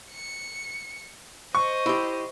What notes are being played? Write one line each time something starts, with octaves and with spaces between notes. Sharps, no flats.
C#7
C5 D#5 C#6
E4 G4